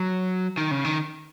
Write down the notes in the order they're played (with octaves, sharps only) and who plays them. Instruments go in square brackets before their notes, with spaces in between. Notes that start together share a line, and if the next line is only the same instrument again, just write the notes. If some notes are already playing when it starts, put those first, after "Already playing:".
Already playing: [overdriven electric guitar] F#3
D#3
C#3
D#3